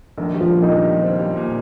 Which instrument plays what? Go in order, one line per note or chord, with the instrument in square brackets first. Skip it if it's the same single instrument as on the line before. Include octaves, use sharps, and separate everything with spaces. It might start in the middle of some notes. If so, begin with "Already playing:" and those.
[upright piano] A#1 [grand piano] D#3 D#4
[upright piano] G3
[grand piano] F3 F4
[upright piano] A#2
[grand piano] D#3 D#4
[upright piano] A#1
G3
C4
G3
A#2